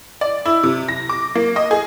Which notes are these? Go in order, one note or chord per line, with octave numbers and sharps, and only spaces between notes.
D5
E4
C3
A#6
D6
A#3
D#5
G#4